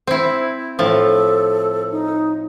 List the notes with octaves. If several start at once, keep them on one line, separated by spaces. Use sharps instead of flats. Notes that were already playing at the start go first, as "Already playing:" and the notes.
C4 E4
A2 F3 A4
D#4